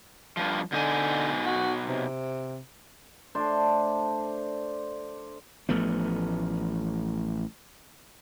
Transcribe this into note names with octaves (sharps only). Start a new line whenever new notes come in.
G2 A#2 F3
B2 D3 D#4 G#5
F#4
C3
A3 D4 C5 D5
A1 F3 A3 B3